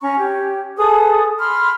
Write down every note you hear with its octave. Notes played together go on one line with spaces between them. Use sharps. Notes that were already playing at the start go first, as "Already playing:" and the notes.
C#4 A#5 C#6
G4 C#5
G#4 A4 B4 D#6
B5 C6 F6